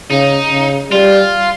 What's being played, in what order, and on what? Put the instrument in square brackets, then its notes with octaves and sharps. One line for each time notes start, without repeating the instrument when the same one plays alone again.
[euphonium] C#3 [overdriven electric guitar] D#4
[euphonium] C#3
[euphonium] G3 [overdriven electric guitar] F4